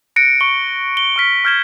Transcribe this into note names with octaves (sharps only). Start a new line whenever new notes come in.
F#6 A#6 C#7 D7
C#6 C#7 G7
G7
C#6 F6 B6
C#6 F6 G6 G#6 E7 G7